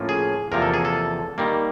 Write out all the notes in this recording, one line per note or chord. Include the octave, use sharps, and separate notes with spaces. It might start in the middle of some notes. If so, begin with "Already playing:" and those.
Already playing: A2 F3 A#3 C#4 F4
G#4
E2 C3 F3 A#3 A#4
A4
G#4
A4
D#3 G3 A#3